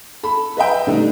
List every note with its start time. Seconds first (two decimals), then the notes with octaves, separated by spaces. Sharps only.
0.23 A4 B5
0.57 B4 D#5 E5 G5
0.87 D3 G3 A3 D#4